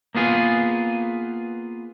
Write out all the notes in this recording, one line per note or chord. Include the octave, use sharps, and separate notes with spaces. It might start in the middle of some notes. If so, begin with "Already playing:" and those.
A#3 B3 F4 G#4